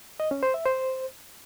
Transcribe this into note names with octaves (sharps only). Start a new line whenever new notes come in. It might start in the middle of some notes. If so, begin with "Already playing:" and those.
D#5
C#4
C5
E5
C5